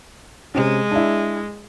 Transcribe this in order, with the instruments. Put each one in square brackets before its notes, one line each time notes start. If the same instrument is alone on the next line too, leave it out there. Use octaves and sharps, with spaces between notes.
[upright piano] C3 C#4 [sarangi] G#3
[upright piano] D4 E4